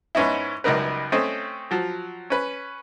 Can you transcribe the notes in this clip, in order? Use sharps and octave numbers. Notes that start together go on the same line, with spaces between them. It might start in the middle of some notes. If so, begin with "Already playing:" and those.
G#2 B3 C#4 D#4 E4
C#2 F#2 G3 D#4 A#4 B4
A3 C4 C#4 D#5
F3 F#3
C#4 B4